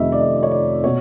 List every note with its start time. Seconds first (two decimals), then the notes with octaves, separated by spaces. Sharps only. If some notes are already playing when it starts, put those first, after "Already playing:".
Already playing: F1 F2 C3 D#3 D#5 E5
0.12 D5
0.19 D#5
0.43 C#5
0.51 D5
0.84 B2 C#5